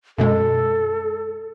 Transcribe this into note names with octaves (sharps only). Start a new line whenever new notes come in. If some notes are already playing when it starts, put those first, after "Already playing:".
F#2 B2 G#3 A4